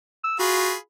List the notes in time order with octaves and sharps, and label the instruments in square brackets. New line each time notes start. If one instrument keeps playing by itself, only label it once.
[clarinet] E6
[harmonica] F4 G#4 B5 [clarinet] F#4